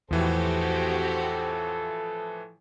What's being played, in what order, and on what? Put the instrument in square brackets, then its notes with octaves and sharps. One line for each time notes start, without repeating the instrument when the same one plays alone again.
[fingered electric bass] E2 [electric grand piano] A2 E3 F3 [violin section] C4 F#4 G4 [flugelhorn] A4